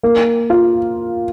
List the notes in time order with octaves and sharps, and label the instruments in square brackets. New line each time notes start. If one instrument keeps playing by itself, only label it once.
[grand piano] A#3
F4